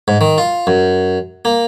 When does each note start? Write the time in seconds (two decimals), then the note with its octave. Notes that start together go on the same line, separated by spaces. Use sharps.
0.08 G#2
0.21 D#3
0.38 F4
0.67 F#2
1.45 A#3